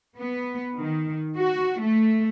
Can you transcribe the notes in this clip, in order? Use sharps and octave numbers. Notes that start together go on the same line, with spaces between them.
B3
D#3
F#4
A3